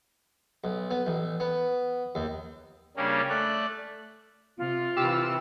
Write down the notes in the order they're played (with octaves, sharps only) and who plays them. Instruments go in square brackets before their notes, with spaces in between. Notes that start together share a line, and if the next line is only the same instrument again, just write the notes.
[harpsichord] B1
B3
A1
B3
D#2
[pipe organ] C#3 G3 A#3 C#4 D4
A3 D5 F#6
[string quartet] C3 [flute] F4
[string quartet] C3 E3 [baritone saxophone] G4 [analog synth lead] E6